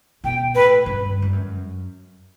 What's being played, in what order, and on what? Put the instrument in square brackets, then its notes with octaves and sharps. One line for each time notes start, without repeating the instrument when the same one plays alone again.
[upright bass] B2 [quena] G5
[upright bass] A2 [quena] B4
[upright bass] G2
G2
F#2